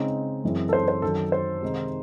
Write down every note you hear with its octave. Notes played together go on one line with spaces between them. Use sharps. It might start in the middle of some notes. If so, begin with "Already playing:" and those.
Already playing: C#3 G#3 C4 D#4
F#2 E3 G#3 C4 E4
A4
C5
C5
F#2 D#3 F#3 C#4 A4
C5
C3 D#3 G#3 D#4